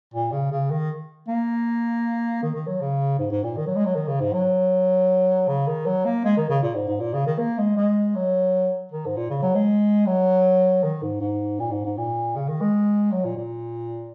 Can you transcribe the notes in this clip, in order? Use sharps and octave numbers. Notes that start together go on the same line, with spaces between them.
A#2
C#3
C#3
D#3
A#3
D#3
D#3
F#3
C#3
G#2
G#2
A#2
D#3
F#3
G#3
F#3
D#3
C#3
G#2
F#3
C#3
D#3
F#3
A#3
G#3
D#3
C#3
A#2
G#2
G#2
A#2
C#3
D#3
A#3
G#3
G#3
F#3
D#3
G#2
A#2
C#3
F#3
G#3
F#3
D#3
G#2
G#2
A#2
G#2
G#2
A#2
C#3
D#3
G#3
F#3
A#2
A#2